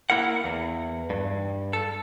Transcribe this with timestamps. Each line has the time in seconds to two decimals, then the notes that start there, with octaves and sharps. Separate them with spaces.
0.10 A#3 E4 A#4 F#5
0.44 E2
1.10 G2
1.73 A4